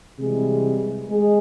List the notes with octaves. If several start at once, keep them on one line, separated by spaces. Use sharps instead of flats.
C3 E3 G3 G#3 G#4
G#3 G#4